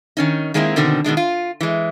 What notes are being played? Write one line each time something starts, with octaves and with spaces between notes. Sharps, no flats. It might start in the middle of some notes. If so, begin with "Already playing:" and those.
D#3 C#4 D#4
D#3 G#3 A#3 C4 E4
B2 D3 D#3 C4
B2 D#3 G#3 D4
F4
E3 G#3